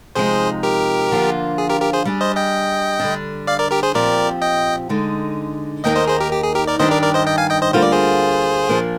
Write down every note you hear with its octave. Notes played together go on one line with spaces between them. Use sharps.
C3 F3 G#3 D#4 G#4 C5
G4 A#4
D3 F3 A#3 D4 F4
G#4
G4 A#4
G4 A#4
G#4 C5
G3 D4 G#4
C5 D#5
D#5 G5
D3 G3 D4
D5 F5
A#4 D5
G4 A#4
G#4 C5
A#2 F3 C4 G4 A#4 D5
D#5 G5
D3 G#3 D#4
D#2 D#3 A#3 D#4 D#5 G5
C5 D#5
G#4 C5
G4 A#4
G4
G#4
G4 A#4
A#4 D5
G2 D#3 G3 D4 G4 C5 D#5
A#4 D5
A#4 D5
C5 D#5
D#5 G5
F5 G#5
D#5 G5
C5 D#5
D2 D3 G3 A#3 F4 C5
D5
G#4 C5
A#2 F3 A#3 D4